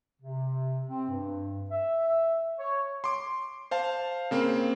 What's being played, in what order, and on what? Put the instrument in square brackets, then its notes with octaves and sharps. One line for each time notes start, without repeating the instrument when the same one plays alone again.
[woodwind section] C3
C4
G2
E5
C#5
[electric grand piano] C6 D6
C5 F5 A5
C#3 A#3 C4